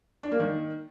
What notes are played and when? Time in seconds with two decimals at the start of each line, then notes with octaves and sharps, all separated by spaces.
0.23 D4
0.31 A#3
0.40 D#3